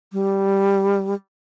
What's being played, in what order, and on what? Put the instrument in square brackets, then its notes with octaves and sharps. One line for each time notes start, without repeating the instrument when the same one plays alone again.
[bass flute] G3